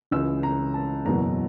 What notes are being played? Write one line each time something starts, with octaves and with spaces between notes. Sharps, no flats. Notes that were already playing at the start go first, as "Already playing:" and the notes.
C#2 C#3 E3 E6
A#5
A5
F#1 E2 B2 F#3 A#5